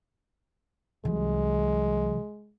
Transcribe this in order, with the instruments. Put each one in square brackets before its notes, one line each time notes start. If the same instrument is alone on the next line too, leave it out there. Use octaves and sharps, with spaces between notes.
[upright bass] C2 [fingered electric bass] C3 E3 F#3 [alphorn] G#3